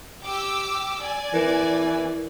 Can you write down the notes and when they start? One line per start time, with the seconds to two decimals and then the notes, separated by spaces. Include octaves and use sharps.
0.24 G4 D6 E6
1.02 D5 G#5
1.34 E3 A#4